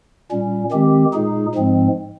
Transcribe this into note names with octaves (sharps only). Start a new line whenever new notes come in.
A#2 G3 C#4
D#3 G#3 C4 G4
A#2 G#3 D#4 G#4
G#2 F3 G#3 C4